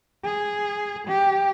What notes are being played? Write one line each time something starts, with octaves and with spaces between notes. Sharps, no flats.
G#4
G4